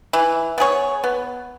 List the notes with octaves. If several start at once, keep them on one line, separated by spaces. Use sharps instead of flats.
E3
B3 G#4 C#5
B3